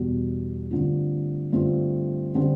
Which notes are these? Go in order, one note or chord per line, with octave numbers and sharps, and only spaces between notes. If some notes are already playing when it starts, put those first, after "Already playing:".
Already playing: E2 B2 G3
G2 D3 A3 C4 F4
G2 D3 A3 C4 F4
D3 G3 C4